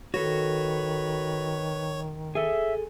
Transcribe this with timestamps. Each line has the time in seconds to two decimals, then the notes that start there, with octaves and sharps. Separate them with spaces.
0.14 D#3 F#4 A4 B4 C#5
2.35 G#4 A4 E5